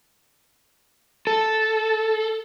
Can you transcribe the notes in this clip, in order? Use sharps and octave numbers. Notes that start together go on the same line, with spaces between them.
A4